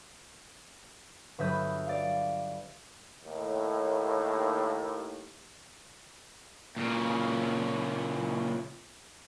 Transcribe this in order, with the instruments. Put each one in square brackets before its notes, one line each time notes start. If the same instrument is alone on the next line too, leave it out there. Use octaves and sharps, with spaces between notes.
[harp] G1 F#3 B4 E5 D#6 G6
D5 F5
[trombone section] D#2 A2
[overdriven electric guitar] A#2 C#3